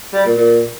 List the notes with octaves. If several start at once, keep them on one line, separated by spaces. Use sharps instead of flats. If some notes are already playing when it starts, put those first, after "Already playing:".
G3
A#2
A#2